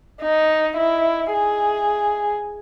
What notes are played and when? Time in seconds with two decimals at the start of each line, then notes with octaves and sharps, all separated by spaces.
0.22 D#4
0.77 E4
1.33 G#4